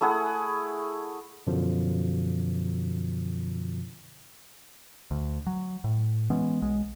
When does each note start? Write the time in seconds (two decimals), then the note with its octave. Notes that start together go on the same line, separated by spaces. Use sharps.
0.01 A3 E4 G#4 F#5
1.47 F#2 B2 D3 F3
5.11 D2
5.47 F#3
5.84 A2
6.30 E3 G#3 B3 C#4
6.62 B1 G#3